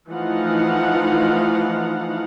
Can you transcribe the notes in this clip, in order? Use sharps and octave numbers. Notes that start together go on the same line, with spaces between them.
E3 F3 A3 D#4 F5 F#5